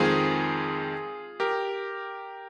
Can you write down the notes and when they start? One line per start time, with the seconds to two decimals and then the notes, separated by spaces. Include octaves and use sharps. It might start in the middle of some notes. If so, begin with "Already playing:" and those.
Already playing: F2 D#3 G#3 C4 F4 G#4
1.40 G4 A#4